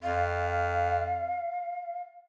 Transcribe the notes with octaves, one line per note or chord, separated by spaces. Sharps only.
F2 F5